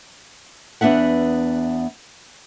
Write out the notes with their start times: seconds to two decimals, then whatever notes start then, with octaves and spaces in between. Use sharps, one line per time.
0.81 E2 B3 D4 E5 F#5